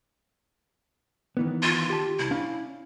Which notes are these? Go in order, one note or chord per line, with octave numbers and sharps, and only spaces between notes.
D#3 E3 B3
F4
G4 A5
C2 E4
C#4 D4 F5